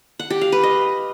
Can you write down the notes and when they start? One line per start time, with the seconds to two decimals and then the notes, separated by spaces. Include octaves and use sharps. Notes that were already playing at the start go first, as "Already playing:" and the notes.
0.19 F#5
0.30 G4
0.41 F5
0.52 B4
0.63 D#5